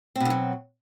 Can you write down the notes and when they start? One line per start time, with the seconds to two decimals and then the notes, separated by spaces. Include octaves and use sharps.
0.16 C4
0.20 B2
0.25 D3
0.30 F#3